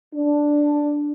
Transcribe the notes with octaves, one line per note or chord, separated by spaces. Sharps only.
D4